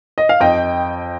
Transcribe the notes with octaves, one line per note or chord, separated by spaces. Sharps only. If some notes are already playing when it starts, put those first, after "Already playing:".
D#5
F5
F2 D#5 G5